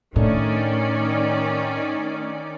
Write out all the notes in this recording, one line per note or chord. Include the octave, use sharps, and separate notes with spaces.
A2 D#3 A3 C#4 D4 D5